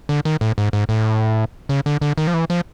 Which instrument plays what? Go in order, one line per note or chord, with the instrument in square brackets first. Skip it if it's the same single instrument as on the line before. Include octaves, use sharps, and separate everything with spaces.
[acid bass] D3
D#3
A2
G#2
G#2
A2
C#3
D3
D3
D#3
F3
E3
F3